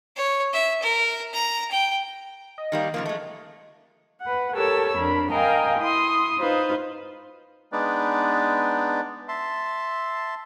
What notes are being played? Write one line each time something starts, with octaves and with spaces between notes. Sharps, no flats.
C#5
E5
A#4
A#5
G5
D#5
D#3 G3 A#3
C#3 F3 A#3
G#3 A3
B4 F#5
G4 A4 A#4 C#5 A5 E6
F2 D4 A#4 B5
A#4 D#5 F5 G5 G#5 A#5
E4 C6 D#6
D#4 F4 B4 C5
G#3 B3 D4 D#4 B4 D5
E5 A5 C6